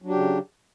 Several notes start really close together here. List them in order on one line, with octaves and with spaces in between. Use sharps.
F#3 D4 G4 C#3